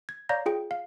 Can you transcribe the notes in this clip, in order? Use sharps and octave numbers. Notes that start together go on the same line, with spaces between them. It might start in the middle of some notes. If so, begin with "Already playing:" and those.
G#6
C#5 D5 F5 A#5 G6 A#6
F4 G#4 G5
F5